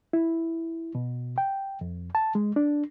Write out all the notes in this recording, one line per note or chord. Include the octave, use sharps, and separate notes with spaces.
E4
B2
G5
F2
A5
G#3
D4